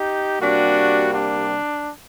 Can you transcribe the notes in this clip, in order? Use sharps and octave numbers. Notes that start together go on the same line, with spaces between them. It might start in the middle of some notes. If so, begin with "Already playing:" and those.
Already playing: D#4 G4
C3 G3 A#3 D4 F#4
D4